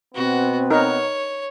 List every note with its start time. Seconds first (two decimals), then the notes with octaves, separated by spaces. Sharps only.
0.15 B2 B3 C4 F#4
0.71 D#4 A#4 C#5